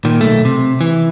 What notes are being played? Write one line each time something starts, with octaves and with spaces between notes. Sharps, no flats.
A#2 D#3
B1 A3
C3
E3